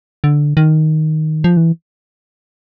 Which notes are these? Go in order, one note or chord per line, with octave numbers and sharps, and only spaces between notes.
D3
D#3
F3
E3